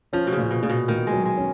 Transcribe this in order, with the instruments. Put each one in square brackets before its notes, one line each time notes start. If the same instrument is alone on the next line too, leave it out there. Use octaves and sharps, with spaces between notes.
[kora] F3 [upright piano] C#4
[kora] B2
C#3
[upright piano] A#2
[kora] B2
[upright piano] A#2 [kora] C#3
[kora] B2
[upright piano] A#2 [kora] D#3
[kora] G#3
[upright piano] F#3
[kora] G#3
[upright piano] C#4